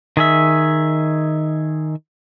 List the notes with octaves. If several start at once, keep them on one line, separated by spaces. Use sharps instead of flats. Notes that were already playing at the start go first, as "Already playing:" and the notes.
D#3 G#4 E5